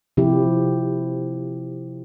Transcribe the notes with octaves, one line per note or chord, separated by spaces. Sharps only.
C3 F3 E4 G4